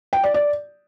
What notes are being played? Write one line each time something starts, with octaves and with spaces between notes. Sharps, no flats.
G5
D5
D5